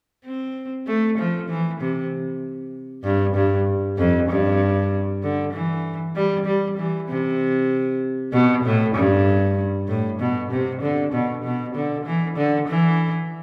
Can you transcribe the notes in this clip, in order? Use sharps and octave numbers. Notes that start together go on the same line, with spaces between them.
C4
A3
F3
E3
C3
G2
G2
F2
G2
D3
E3
G3
G3
E3
C3
B2
A2
G2
A2
B2
C3
D3
B2
B2
D3
E3
D3
E3